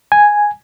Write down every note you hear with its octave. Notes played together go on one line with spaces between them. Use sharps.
G#5